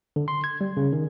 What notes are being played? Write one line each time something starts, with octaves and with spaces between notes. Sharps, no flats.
D3
C6
G#6
G3
C#3
D#3